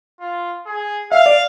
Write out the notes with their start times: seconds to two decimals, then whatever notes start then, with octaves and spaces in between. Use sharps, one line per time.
0.20 F4
0.66 G#4
1.12 E5 F5
1.26 D5